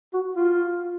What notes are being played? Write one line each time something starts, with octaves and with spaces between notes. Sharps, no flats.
F#4
F4